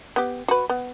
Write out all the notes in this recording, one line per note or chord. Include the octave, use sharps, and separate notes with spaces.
B3 G4
F#4 B4
B3